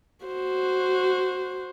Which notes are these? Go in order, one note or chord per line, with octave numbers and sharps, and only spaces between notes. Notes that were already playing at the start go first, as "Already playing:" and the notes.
F#4 C5